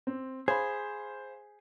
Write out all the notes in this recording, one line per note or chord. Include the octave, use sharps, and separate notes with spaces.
C4
G#4 C5 F5 B5